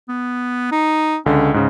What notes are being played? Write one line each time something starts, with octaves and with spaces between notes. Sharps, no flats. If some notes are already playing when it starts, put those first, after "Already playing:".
B3
D#4
C#2 D3 C#4
G#2 C#3